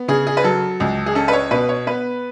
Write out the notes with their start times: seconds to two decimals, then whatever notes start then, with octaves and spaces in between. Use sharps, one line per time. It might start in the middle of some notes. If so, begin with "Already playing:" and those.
Already playing: B3
0.08 C#3 G#4
0.27 G#4
0.37 B4
0.44 F#3 A4
0.80 C#2
1.06 G#4
1.15 C#4 A4
1.28 B4
1.33 C#5
1.51 B2 B4
1.69 C#5
1.86 B3 B4